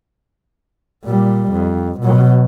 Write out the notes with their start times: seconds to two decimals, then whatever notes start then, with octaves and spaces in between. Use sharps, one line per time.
1.05 A#2 G3
1.52 F2
2.00 B2 F#3